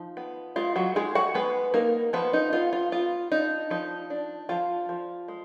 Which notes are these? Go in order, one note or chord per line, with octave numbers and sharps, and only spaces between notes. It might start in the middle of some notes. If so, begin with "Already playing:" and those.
Already playing: F3 D#4
B3
G#3 F4
F#3 F#4
G#3 D#4 G#4
F#4 F#5
G#3 B3 B4
A#3 D#4 A#4
F3 B3 B4
D#4
B3 F4
F4
B3 F4
D4 D#4
F3 D#4
D4
F3 F4
F3
G#3